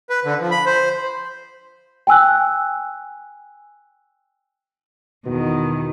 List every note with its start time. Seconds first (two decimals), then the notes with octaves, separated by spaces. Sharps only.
0.10 B4
0.25 D3
0.39 F3
0.51 B5
0.66 C5
2.07 G5 G#5 E6 F#6
5.26 E2 B2 D#3